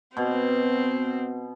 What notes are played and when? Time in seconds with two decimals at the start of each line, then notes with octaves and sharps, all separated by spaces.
0.17 B2 C4